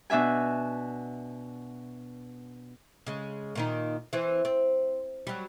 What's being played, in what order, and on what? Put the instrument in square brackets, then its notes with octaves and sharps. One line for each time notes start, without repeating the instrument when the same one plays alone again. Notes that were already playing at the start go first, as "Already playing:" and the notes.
[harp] B2 D4 E5 G#5
[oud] C#3 G#3
A#2 D#3 D#4
E3 C4
C4
F#3 G3